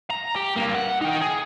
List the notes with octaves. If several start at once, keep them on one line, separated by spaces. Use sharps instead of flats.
A#5
G4
G2 A#3
F#5
D#4 G5
G#4